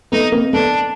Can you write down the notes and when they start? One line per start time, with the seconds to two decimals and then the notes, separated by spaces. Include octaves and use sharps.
0.12 A3 B3 D#4
0.32 A#3 C4
0.53 A3 B3 D4